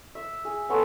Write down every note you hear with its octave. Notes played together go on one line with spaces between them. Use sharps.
E5
G#4
B3 C#4 A4 C6